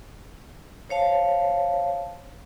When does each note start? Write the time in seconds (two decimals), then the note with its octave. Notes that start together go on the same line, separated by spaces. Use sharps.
0.89 C5 C#5 F5 A5